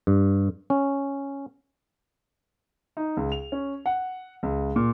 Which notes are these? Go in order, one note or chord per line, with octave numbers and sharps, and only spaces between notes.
G2
C#4
D#4
C#2
F7
C#4
F#5
C#2
A#2